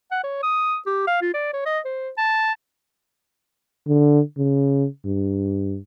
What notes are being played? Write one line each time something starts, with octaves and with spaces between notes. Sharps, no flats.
F#5
C#5
D#6
G4
F5
F4
D5
C#5
D#5
C5
A5
D3
C#3
G2